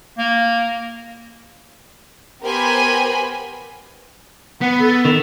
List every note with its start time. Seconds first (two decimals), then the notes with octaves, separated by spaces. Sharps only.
0.19 A#3
2.43 B3 G4 A#4 C5 G#5 B5
4.61 B3 F#5
4.80 A4
5.05 D#3